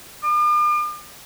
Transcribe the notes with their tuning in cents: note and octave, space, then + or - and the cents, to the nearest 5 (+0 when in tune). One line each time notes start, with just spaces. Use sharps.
D6 +45